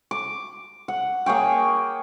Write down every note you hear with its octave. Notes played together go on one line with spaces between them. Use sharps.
D6
F#5
A#3 G#4 C#5 G5